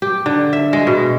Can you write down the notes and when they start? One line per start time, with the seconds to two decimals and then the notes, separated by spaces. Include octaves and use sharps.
0.02 G4
0.26 D3
0.53 E5
0.73 G#3
0.87 B2